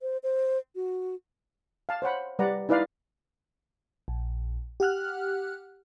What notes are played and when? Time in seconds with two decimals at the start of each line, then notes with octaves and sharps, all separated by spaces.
0.01 C5
0.23 C5
0.75 F#4
1.89 F5 A5
2.02 C5 C#5 F#5 B5
2.39 G3 B4 D5 F#5 A#5
2.69 D#4 E4 B4 D5 F5
4.08 A#1
4.80 G4 F#5 F6 F#6